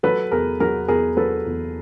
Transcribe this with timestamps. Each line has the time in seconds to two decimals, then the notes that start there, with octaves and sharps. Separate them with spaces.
0.03 F#3 A4 B4
0.32 E2 G#4 A#4
0.60 F#3 G#4 A#4
0.88 E2 G#4 A#4
1.17 F#3 A4 B4
1.46 E2